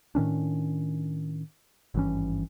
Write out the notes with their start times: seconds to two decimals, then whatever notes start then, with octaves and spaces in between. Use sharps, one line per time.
0.15 A2 D#3 C#4 D4
1.94 G#1 G2 E3 C#4